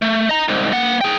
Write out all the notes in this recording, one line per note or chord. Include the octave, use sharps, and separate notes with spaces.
A3
D#5 A#5
C2 G#2
A#3 F#5
G#4 G5